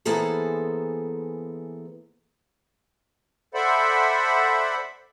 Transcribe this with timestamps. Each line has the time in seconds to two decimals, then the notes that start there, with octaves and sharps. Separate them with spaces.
0.05 E3 A#3 B3 G#4 A4 C5
3.54 A4 C5 D5 E5 F#5 B5